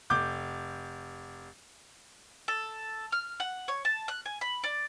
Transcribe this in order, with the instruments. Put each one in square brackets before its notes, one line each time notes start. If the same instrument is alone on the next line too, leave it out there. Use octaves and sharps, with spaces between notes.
[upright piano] F1 D6 G6
[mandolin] A4
F6
F#5
C#5
A5
F#6
G#5
B5
D5